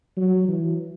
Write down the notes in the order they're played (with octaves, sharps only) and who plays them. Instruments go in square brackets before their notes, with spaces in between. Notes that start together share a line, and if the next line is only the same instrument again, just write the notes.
[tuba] F#3
E3